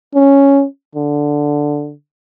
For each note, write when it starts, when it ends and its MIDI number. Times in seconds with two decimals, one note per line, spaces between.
0.14 0.65 61
0.95 1.93 50